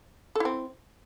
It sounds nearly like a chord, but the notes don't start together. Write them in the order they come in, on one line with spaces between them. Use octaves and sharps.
A4 E4 C4